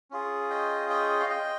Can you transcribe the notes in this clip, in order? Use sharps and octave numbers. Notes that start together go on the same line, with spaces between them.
C#4 F4 G#4
D#5 G5
D#5 G5
F5
D#5 G5